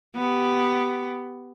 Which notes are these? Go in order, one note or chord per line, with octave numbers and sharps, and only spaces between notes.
B3 G4